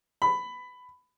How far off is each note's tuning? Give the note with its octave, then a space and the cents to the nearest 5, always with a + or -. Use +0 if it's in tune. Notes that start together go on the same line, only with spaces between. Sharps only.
B5 +15